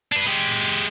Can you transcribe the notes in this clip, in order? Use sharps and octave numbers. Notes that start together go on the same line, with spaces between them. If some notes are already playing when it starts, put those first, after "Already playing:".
D4 B4
G#3 G4